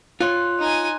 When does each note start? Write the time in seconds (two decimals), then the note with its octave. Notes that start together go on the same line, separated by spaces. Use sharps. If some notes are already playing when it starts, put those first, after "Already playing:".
0.21 F4 C#5 C6 F#6
0.59 D#4 G#5